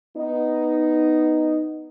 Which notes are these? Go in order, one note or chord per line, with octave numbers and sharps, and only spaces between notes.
B3 D#4